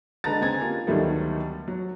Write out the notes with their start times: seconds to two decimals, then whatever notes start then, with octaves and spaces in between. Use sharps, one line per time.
0.24 D3 G#3 B4 A5 A#5 A6
0.41 C#3 C4 G#5 A#5 G#6
0.61 A#3 F4 G4
0.87 D2 D#3 F#3 G3 A3 B3
1.68 F#3